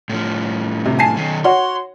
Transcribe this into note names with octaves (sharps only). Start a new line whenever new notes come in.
A2 F3
C3
G#5 A5 C7
B2 D#3
F#4 C#5 F#5 C6